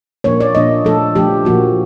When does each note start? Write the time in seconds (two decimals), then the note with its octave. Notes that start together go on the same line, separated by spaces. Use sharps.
0.24 A#2 F3 A#3 D4 C#5
0.41 D5
0.55 A#2 F3 A#3 D4 D#5
0.85 F3 A3 D4 A4
1.16 F3 A3 D4 G4
1.45 A#2 F3 A#3 F#4